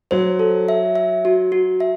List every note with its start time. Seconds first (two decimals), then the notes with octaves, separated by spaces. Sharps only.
0.11 F#3 C5
0.39 A4
0.68 E5
0.95 E5
1.25 F#4
1.52 F#4
1.80 E5